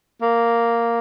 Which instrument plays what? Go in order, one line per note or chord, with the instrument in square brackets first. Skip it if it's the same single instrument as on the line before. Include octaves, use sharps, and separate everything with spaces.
[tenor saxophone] A#3